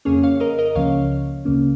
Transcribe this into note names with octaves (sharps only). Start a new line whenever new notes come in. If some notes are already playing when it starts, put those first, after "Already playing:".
F2 C#3 A#3 C#4 G#4 C#5
C#5 F5
A#4 D#5
A#4 D#5
C#2 C#3 F3 A#3 C#4 C#5 F5
C#2 C#3 A#3 C#4